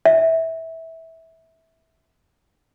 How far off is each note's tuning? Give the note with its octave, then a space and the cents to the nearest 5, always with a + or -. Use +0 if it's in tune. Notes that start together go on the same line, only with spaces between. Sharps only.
E5 -20